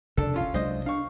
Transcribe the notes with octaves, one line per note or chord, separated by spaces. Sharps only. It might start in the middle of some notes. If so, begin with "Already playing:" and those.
F1 C2 C#3 D4 A4
C#4 F4 F5
C2 F#3 G#3 D4 C5 D#5
D4 F5 C#6